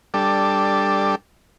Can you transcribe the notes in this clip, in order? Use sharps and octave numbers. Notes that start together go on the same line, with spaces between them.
G3 D4 A4